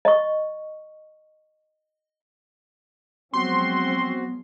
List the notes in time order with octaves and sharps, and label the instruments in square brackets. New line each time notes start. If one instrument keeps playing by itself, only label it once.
[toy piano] D#5 C#6
[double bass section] F3 F#3 G#3 [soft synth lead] B3 [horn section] C4 F#4 [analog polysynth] C6